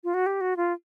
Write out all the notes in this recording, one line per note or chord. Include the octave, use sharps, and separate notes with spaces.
F4
F#4
G4
F#4
F4